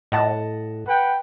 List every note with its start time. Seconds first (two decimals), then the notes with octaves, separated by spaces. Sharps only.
0.12 A2 D#5 F#5 A5
0.86 B4 F#5 G5